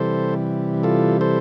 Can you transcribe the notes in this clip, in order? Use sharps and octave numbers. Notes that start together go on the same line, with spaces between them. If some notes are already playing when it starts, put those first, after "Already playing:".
Already playing: C3 E3 G3 A4 C5
F4 A4
A4 C5